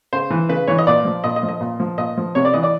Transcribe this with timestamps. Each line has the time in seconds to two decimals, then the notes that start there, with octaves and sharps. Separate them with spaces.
0.13 C#3 C5
0.30 E3
0.49 C#3 B4
0.68 E3 C#5
0.78 D#5
0.87 A#2 D5
1.05 F3
1.24 A#2 D#5
1.36 D#5
1.43 F3
1.49 D#5
1.60 A#2
1.80 F3
1.98 A#2 D#5
2.17 F3
2.35 C3 C#5
2.45 D5
2.54 E3 D#5
2.63 D5